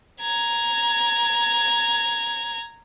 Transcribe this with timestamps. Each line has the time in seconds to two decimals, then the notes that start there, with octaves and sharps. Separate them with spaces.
0.21 A#5 G#6